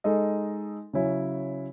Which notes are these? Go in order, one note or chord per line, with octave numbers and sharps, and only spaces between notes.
G#3 D#4 A4 D#5
C#3 F#3 C#4 E4